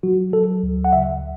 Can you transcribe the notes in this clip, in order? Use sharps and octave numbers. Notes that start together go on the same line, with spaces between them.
F#3 F#4
F#3 A4
D2
F#5
C#3 E5